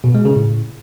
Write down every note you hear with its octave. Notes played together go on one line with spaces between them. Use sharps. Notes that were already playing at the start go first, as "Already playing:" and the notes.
B2
G#3
C#3
A2